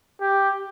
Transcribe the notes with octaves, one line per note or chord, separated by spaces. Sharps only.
G4